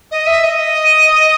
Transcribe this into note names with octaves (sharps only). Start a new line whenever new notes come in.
D#5
E5
D#5